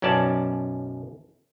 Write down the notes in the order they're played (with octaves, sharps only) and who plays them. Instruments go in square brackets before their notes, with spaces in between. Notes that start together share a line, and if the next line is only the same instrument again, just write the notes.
[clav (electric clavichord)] B1 F#2 C#4 D5 A5